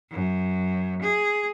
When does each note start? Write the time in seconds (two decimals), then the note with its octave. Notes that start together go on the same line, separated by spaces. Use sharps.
0.11 F#2
1.02 G#4